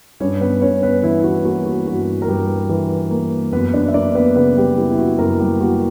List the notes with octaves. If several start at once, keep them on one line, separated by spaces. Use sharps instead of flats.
G2 C#4 C#5
B3 B4
G2 C#4 C#5
B3 B4
E3 E4
E4
F#4
A#3 F#4
F#4
G2 F#4
A#4
G2 G3 G4
E3
A#3
F#2 B3 B4
D4 D5
E5
A#3 D4 D5
B3 B4
C#3 B3 B4
G3 G4
G3 E4
E4
F#4
F#2 A#3 A#4
G3 G4
A#3 F#4